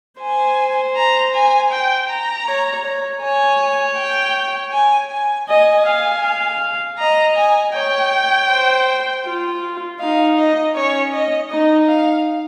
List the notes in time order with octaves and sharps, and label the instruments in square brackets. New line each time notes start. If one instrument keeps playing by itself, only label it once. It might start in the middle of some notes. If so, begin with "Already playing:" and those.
[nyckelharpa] C5 [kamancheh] G#5
[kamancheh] A#5
G#5
G5
A#5
[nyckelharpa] C#5
C#5
[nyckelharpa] C#5 [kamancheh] G#5
[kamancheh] G5
G#5
G#5
[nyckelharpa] D#5 [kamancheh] G#5
[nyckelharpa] F5
F5
[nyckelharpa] D#5 [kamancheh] A#5
[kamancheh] G#5
[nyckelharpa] C#5 [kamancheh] G5
[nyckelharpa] C5
F4
[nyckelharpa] D#4 [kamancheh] F5
[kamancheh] D#5
[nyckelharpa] C#4 [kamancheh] C#5
[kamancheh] D#5
[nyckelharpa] D#4 [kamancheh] D#5
[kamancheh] F5